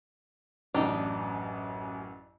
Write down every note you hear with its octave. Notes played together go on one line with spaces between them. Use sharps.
A1 F#2 D4 D#4 G4